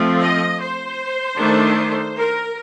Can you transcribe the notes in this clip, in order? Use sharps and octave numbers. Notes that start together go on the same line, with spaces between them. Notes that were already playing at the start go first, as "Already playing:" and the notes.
Already playing: F3 A3 C4
D#5
C5
D#3 A3 D4
A#4